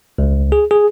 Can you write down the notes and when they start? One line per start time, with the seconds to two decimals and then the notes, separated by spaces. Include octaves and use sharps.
0.18 C#2
0.52 G#4
0.71 G#4